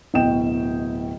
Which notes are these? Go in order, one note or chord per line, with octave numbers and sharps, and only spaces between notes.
D1 B2 D#5 G5 E7